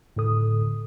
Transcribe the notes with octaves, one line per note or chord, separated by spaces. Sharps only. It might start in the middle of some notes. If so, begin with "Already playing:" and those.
A2 D3 A4 D#6